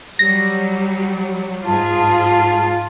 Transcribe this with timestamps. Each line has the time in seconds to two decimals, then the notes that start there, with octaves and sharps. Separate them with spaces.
0.19 F#3 G3 A#6
1.65 G#2 F4 G#4 A5